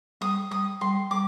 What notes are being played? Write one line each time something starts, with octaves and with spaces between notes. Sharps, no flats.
G3 D#6
G3 D#6
G3 C6
G3 D6